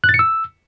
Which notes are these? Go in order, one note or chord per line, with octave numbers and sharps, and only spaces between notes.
F#6
A6
C#7
E6